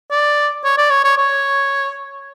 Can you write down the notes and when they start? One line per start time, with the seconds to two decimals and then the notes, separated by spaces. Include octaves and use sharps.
0.11 D5
0.64 C#5
0.78 D5
0.90 C#5
1.04 C#5
1.17 C#5